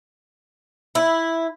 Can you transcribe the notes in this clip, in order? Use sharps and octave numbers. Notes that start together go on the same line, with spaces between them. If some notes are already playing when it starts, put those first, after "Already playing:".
E4